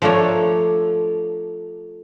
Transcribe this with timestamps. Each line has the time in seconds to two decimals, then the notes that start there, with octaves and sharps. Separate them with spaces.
0.02 F3 A3 D4 A#4 C#5